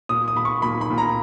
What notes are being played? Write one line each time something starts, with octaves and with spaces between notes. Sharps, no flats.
A#2 D#6
D#6
A#2 B5
C#6
A#2 B5
B5
A#2
A#5